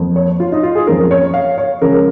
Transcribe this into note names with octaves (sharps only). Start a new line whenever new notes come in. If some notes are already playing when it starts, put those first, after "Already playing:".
Already playing: F2 F3 A#3
C#5
F4
D#4
F4
G#4
F2 F3 A#3 C#4 A#4
C#5
F5
C#5
C#3 F3 G#3 C#4 A#4